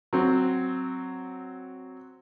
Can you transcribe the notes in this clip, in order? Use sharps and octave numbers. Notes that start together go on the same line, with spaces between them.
F#3 C4